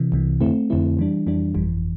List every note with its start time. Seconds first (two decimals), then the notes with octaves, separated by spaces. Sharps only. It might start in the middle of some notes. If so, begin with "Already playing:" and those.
Already playing: C3 E3
0.12 C2 C3 E3
0.41 F2 D3 A3 C4 E4
0.70 F2 D3 A3 C4 E4
0.97 F2 E3 G3 D4
1.26 F2 E3 G3 D4
1.54 G1 F2 E3 G3